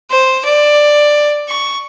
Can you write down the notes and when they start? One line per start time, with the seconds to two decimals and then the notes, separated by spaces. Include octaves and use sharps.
0.10 C5
0.45 D5
1.48 C#6